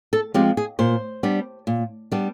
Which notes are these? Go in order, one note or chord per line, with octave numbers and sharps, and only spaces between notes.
A4
F3 G#3 C4 G4
G#4
A#2 C5
G3 B3 D4
A#2
G3 B3 D4